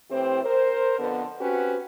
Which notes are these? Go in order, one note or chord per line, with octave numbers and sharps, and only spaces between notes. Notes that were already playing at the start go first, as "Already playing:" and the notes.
A2 E3 C4 G4 C5
A#4 C5
F2 D3 B3
C4 C#4 F#4 G4 B4